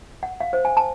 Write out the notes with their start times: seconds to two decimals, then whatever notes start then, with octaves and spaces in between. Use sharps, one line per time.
0.23 F#5
0.40 F5
0.53 C5
0.65 G#5
0.77 A5